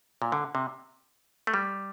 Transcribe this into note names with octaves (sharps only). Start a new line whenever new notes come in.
A#2
D3
C3
A3
G3